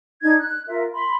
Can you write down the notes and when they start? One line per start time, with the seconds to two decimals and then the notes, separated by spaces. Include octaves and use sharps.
0.21 D4 D#4 G#6
0.40 F#6
0.66 F4 A#4 E5
0.93 B5 C6